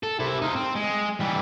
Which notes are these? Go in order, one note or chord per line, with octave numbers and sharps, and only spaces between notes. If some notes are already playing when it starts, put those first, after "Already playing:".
A4
C3 E4
D#4 F4
C4
G#3
E3 G3